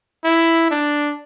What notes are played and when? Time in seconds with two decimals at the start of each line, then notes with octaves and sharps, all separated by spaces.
0.24 E4
0.71 D4